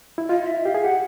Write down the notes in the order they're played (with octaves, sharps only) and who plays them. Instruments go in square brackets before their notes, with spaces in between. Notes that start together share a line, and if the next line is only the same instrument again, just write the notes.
[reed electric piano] E4
[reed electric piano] F4 [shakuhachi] D#5
[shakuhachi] E5
[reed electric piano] G4 [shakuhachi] F5
[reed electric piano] G#4
[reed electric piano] G4 [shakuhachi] F#5